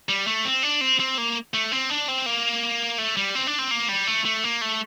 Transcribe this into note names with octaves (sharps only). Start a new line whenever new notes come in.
G3
A3
C4
D4
C4
C4
A#3
A3
C4
D4
C4
A#3
A3
G3
C4
D4
C4
A#3
G3
A3
A3
A#3
A3